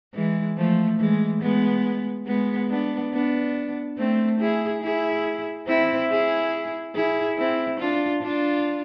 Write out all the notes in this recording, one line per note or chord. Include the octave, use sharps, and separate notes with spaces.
E3 G#3
F3 A3
E3 G#3
G#3 B3
G#3 B3
B3 D4
B3 D4
A3 C4
E4 G#4
E4 G#4
C4 E4
E4 G#4
E4 G#4
C4 E4
D4 F4
D4 F4